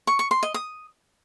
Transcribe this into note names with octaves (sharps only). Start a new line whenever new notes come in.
C#6
C#6
C6
D#5
D#6